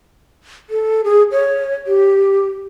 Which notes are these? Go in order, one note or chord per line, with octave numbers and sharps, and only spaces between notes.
A4
G#4
C#5
G4